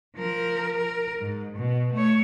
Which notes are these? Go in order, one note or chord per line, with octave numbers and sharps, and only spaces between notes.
F3 A#4
A#4
G#2
B2
A3 C#5